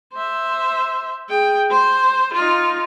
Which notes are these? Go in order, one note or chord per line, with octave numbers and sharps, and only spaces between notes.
C5 E5
G#4 G5
C5
D#4 F4